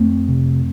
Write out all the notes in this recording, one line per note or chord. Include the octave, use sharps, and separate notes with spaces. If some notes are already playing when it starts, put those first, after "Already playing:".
Already playing: F2 A3 C4
C3